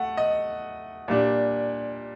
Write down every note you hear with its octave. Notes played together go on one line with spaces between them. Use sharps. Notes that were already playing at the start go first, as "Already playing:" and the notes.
Already playing: A3 F#5
D#5
A#2 G3 D4